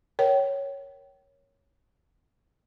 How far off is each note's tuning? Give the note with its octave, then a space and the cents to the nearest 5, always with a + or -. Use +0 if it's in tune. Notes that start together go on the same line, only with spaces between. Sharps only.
A#4 +10 C#5 +0 G5 -30